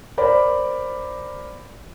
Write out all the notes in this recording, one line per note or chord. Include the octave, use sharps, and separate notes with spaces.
A#4 C5 D5 B5